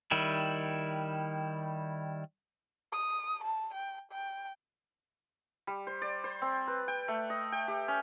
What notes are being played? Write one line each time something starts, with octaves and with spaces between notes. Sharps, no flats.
D#3 G3 E4
D#6
A5
G5
G5
G3
C5
D5
C5
C4
B4
G5
A3
D#5
G5
G4
C#4